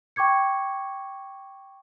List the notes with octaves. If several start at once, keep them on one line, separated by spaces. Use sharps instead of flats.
G5 C#6 D6 G#6 C#7